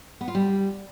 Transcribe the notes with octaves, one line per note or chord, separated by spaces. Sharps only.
B3
F4
G3